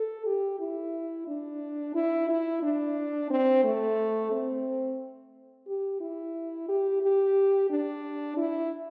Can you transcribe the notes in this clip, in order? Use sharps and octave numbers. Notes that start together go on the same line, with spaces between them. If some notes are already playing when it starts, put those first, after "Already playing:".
Already playing: A4
G4
E4
D4
E4
E4
D4
C4
A3
C4
G4
E4
G4
G4
D4
E4